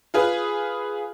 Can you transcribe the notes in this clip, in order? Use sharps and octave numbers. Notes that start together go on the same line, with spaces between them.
F4 G#4 B4